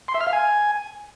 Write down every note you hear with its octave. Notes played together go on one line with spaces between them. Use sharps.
C6
E5
F6
F5
G#5